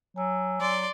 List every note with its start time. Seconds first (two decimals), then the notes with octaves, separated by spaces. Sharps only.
0.16 F#3 G#5 E6
0.61 F#3 D5 C6